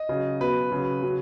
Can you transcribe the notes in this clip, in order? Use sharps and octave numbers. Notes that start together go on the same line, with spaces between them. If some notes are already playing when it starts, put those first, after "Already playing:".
Already playing: D#5
C#3 F#3
B2 F#3 B4
C#3 F#3
C#3 F#3